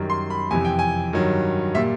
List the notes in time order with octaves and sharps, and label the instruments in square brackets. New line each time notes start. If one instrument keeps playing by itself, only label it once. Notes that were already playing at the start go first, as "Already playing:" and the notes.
Already playing: [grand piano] F#2 D#3 G3
C6
B5
F2 C3 E3 G#5
G5
G#5
G2 D#3 F#3
A#2 G3 E5